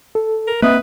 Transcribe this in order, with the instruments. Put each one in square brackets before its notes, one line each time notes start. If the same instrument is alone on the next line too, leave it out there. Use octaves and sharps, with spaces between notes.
[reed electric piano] A4
[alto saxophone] A#4
[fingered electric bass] A#3 C4 [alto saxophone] B4 [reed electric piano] D#5 E5 D#6